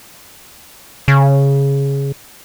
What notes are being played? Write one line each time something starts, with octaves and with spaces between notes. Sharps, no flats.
C#3